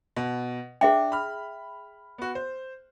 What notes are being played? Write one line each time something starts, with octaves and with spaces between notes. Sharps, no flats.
B2
D4 G#4 E5 G5
B5 F6
B3 F#4
C5